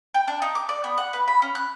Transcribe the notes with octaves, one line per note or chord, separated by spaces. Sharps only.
G5
D4
D#4
D6
D5
B3
F#5
B4
B5
C#4
F#6